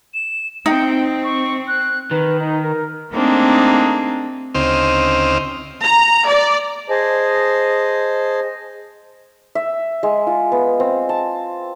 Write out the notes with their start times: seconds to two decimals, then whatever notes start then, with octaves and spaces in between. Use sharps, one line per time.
0.14 E7
0.66 C4 D#4 G5
1.24 C#6
1.68 F#6
2.11 D#3 B4
2.39 D#4
2.63 A#4
3.13 A3 A#3 C4 D4 D#4 G#4
4.55 D2 C#3 C4 D#4 C5 F6
5.83 A#5
6.28 D5
6.90 G#4 C5 D#5 G#5 A5
9.55 E5
10.03 G#3
10.27 F4
10.52 B3
10.80 C4
11.09 A5